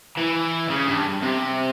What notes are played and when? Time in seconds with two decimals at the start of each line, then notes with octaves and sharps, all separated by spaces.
0.17 E3
0.70 C#3
0.87 G2
1.23 C3